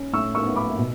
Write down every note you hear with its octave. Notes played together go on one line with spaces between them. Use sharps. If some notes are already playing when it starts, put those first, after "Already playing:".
Already playing: C#4
A2 C#6 E6
C#6 E6
B3
B5 D6
B2